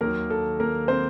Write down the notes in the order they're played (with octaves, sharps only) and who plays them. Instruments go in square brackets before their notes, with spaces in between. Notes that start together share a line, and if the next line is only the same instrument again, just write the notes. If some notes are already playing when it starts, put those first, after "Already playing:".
[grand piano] D#2 D#3 F#3 A#3 A#4
A4
A#3 A#4
C4 C5